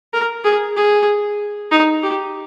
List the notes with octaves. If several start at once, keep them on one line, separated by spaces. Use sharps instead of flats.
A#4
G#4
G#4
D#4
G4